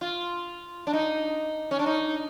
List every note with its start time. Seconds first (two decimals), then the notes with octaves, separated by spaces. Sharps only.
0.01 F4
0.87 D4
0.93 D#4
1.71 C#4
1.79 D4
1.86 D#4